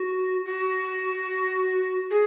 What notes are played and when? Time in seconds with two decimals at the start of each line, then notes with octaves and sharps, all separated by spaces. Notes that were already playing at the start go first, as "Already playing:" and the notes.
Already playing: F#4
0.45 F#4
2.11 G#4